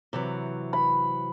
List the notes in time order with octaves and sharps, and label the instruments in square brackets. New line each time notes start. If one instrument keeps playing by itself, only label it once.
[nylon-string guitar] C3 E3 F#3
[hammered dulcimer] B5